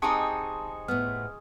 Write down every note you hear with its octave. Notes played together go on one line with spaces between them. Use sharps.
G#3 C4 D#4 G4 A5 C#6 D#6
A2 B3 F6